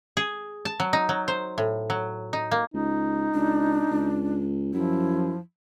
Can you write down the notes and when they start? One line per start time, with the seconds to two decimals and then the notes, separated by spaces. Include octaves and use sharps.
0.17 G#4
0.65 A5
0.80 F#3
0.93 D#4
1.09 F#3
1.28 C5
1.58 A2
1.90 F#3
2.33 D#4
2.51 A#3
2.74 C#2 D#4
3.34 C#2 D4
3.91 C#2
4.74 F#2 F3 E4